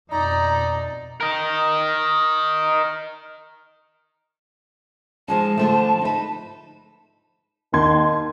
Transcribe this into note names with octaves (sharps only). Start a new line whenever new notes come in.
F2 B2 D#4 D5 A#5
A#4 D#5
F3 G#3 D#4 A5
D3 F3 A3
D#4 B4
D#2 D#3 C6 G#6